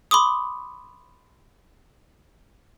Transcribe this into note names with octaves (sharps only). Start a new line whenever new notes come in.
B5 C6 D6 D#6